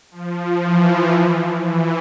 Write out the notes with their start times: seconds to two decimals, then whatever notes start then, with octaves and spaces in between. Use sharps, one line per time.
0.11 F3
0.62 E3
1.64 E3